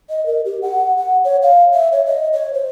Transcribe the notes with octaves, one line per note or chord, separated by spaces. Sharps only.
D#5
A#4
G4
F#5
F#5
C#5
F5
E5
C#5
D#5
C#5
C5